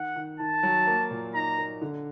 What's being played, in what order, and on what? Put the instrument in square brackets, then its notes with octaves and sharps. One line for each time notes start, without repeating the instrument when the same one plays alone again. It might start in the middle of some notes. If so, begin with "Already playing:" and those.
Already playing: [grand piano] D#3 [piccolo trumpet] F#5
[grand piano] D#3
[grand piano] D#3 [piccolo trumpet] A5
[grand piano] F#3
A#3
A#2
[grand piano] D#4 [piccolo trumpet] A#5
[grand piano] A#3
D3